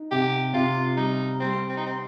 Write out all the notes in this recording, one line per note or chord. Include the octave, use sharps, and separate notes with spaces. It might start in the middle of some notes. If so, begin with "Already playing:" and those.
Already playing: D#4
C3 G4
C3 F4
G3 D#4
G3 C4
C4
D#4
C4